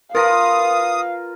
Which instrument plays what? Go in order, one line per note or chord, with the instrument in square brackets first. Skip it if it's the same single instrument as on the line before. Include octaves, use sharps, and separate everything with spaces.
[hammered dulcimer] F4 A#5 [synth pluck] A#4 B4 [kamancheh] F5 [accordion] D#6